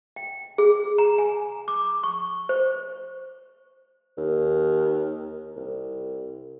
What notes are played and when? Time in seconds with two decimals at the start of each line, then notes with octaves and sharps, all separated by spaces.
0.16 G5
0.58 G#4
0.98 A#5
1.18 G#5
1.68 D6
2.03 C#6
2.49 C5
4.18 D#2
5.56 C2